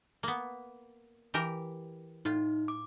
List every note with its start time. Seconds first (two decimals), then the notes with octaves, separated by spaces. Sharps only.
0.23 A#3 B3
1.34 E3 G4 A#4
2.25 A2 D#4 F4
2.68 D6